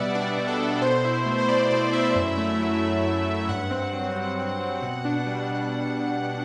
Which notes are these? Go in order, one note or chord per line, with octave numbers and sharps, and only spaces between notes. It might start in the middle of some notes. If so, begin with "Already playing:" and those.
Already playing: B2 G3 B3 D5 E5 F#5
D4 D5
B2
A4
B3
B2 C5
E4
A3
C5
B2 D5
B2 D5
E4 E5
F#2
A3
F#3
E4
F#2
A3
G2 F#5
C4
F#3
G2
G2
C4
B2
D4
G3
B2